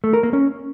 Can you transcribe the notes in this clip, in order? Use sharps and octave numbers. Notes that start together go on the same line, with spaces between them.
A3
A#4
A#3
C#4